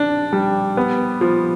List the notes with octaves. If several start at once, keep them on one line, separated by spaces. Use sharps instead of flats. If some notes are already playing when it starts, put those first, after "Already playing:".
Already playing: D4
G3
B3
F3